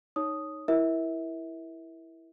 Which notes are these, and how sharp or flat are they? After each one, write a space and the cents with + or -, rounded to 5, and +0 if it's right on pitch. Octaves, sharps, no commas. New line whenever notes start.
D#4 +0 C#5 +0 D#6 +0
E4 +0 A#4 +20 E5 -30